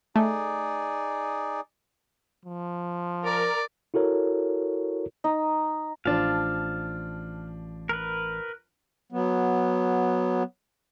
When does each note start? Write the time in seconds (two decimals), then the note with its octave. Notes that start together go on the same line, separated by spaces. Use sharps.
0.16 A3 D#4 G#4 D5
2.45 F3
3.25 A#4 D5
3.94 E4 F#4 A4 A#4 C#5
5.24 D#4
6.05 A1 F3 D4 F5 A5
7.89 A#4 B4
9.12 F#3 B3